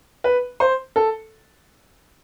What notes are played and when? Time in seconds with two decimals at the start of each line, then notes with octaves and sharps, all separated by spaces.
0.24 B4
0.60 C5
0.96 A4